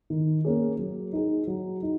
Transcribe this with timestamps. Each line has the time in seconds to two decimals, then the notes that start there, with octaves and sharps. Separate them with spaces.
0.10 D#3
0.45 A#3 C#4 G#4
0.79 F#3
1.13 D#4 G#4
1.47 F#3
1.83 D#4